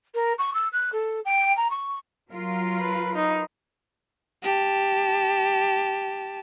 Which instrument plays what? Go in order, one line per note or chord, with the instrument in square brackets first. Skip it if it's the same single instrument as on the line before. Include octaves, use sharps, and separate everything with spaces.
[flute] A#4
C#6
E6
F#6
A4
G5
A#5
C#6
[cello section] F#3 F4 A#4
[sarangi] B4
D#4
[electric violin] G4 A5